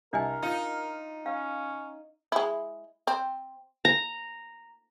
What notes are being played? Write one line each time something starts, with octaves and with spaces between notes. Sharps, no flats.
C2 D4 A#4 D#5 G#5
D#4 F4
C#4 F5
G#3 E4
C4
A#5